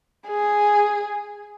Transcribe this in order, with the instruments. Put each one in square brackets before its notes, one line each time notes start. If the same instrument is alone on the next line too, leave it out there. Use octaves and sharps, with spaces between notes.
[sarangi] G#4